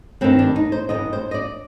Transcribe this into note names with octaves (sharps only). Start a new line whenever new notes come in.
G2 D#3 C4
D4
D#4
C5
D#3 D#5
G2
C5
D#5
D5